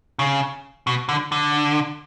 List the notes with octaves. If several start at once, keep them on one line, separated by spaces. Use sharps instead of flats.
C#3
B2
D3
D3